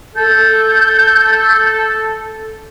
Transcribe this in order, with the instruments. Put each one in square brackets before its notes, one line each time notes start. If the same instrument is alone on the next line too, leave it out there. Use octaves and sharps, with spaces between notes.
[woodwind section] A4 [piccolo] G6